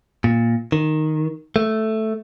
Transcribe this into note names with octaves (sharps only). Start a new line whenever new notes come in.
A#2
D#3
A3